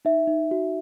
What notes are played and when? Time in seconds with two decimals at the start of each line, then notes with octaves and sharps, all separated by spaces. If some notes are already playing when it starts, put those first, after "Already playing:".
0.05 D#4 E5
0.27 D#4
0.51 F#4